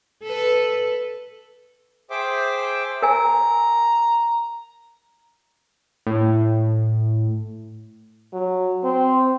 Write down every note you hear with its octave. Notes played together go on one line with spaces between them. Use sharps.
A4 B4
G#4 C5 E5 G5 D6
A#4 G#5 A#5
A2
F#3
C4